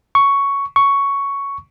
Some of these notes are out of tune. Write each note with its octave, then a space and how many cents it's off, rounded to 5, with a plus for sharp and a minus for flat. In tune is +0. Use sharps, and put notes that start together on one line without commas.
C#6 +5
C#6 +5